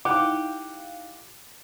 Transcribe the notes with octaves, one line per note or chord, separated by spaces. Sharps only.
D#4 E4 G4 F5 F#5 D6